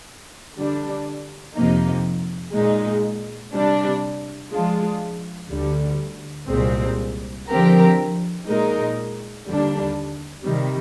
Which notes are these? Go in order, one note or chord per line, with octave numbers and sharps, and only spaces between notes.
D3 G3 D4
F2 C3 F3 A#3 D#4
A#2 G#3 D#4
C3 G3 D4
F3 G#3 D4 F4
D2 D3 G3
C2 A#2 G#3 C4
D3 F3 C4 G4 A#4
A#2 G#3 D#4 A#4
D#2 D3 G3 A#3 D4
C3 D#3 G3